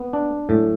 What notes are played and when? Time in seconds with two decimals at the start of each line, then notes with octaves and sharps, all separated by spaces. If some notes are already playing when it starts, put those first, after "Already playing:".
Already playing: B3
0.13 D4
0.49 A2 F#3 G#3